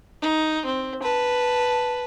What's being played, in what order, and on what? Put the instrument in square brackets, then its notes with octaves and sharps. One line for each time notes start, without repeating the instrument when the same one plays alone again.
[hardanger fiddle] D#4
C4
B4 A5